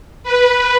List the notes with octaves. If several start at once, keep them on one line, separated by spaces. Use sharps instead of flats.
B4